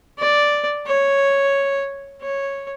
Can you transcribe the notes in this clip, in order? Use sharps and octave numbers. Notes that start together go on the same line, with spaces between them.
D5
C#5
C#5